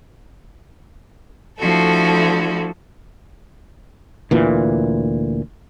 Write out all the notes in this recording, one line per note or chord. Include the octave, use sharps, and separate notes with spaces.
F3 A3 D4 E4 F#4 A4
D2 A#2 E3